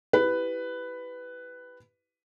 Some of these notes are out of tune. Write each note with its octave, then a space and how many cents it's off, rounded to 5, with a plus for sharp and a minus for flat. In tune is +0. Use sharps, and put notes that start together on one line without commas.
E4 +0 G4 +0 B4 +10